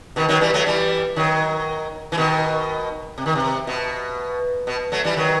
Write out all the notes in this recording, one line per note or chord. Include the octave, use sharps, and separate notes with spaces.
B2 D#3
D#3 F#3
E3 G3
F#3 A3
E3 G3
D#3 F#3
E3
B2 D#3
C3
D#3
C3
B2
B2
F#3 A3
E3 G3
D#3 F#3